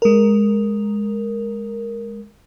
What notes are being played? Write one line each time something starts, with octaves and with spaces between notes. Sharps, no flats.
G#3 A#4